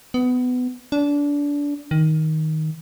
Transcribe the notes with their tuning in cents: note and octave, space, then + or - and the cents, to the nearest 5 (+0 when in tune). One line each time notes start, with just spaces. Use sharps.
B3 +20
D4 -25
D#3 +10